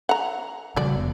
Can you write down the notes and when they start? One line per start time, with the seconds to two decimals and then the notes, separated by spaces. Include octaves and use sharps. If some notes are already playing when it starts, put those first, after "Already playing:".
0.09 F#5 A#5
0.76 C#3 F3 G3 F#4 D5
0.95 F1 F2 B3